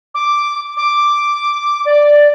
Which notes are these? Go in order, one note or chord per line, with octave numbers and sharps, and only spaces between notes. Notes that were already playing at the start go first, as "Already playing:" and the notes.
D6
D6
D5